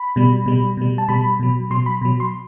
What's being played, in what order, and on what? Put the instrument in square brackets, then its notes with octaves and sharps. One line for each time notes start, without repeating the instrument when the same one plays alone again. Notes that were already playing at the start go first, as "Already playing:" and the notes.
Already playing: [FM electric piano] B5
B2 G3
B2 G3
B2 G3
A5
B2 G3 B5
B2 F#3
B2 F#3 C6
B5
B2 F#3
C6